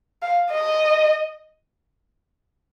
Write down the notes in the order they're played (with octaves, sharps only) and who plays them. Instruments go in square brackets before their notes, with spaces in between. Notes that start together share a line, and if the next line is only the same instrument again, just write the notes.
[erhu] F5
D#5